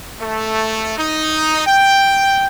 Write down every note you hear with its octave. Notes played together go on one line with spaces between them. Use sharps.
A3
D#4
G5